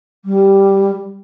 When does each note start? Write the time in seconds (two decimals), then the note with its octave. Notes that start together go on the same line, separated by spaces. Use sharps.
0.25 G3